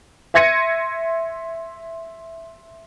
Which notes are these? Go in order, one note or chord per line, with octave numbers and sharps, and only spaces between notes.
E5 C6 G#6 A#6 C#7 D#7